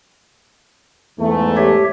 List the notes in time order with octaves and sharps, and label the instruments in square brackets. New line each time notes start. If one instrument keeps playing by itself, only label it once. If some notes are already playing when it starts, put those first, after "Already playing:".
[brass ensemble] E2 G#2 A3
[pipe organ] G4 C#5 E5